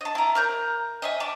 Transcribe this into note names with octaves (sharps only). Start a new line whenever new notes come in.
D#5 A5
E4 A#5
A#4 A#5 G6
D#5 E5 G#5
A5 D6